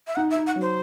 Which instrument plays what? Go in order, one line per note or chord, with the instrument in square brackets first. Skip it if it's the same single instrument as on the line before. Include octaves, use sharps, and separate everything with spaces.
[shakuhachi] E5
[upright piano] D#4 [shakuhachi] F#5
[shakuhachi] E5
[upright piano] D#4
[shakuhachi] F#5
[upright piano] F#3
[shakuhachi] C5